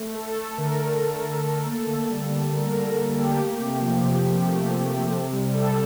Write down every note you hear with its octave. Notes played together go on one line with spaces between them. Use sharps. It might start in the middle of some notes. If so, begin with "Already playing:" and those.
Already playing: A3
A3 A4
A3
D3 A#4
A3
D3
A3
A3
A#3 A4
D3
G3
D3
D3 A#4
D3 A#4
A#3 A4
A#3 G4
A3
C3
F3
C3
F3
A3
C3
C3
C3 A4
G3
G3 A4